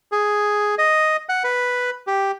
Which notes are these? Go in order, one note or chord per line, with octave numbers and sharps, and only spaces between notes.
G#4
D#5
F#5
B4
G4